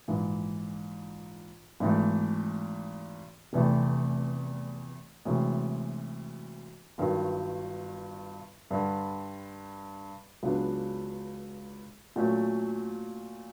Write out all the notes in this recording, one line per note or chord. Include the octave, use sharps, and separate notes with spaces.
A#1 G#2 E3
G#1 G#2 E3 A3
F1 E2 C3 E3 A3
D2 C3 E3 G#3 C#4
G1 G2 D#3 F#3
G2 D3 G3
C#2 C#3 F#3 B3 D4
A#2 F#3 A3 C#4